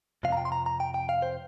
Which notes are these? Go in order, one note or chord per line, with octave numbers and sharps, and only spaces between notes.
F2 C3 F3 F5
A#5
G5
C6
A#5
A#5
G5
G5
F5
C5